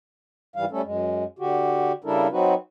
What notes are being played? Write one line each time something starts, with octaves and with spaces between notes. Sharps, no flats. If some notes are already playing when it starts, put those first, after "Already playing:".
G#2 E3 G3 F5
G3 A3 C#4 A4
F#2 G#3
D3 F#4 G4
C#3 G3 D4 E4 A4 A#4
F#3 C4 D#4 F#4 B4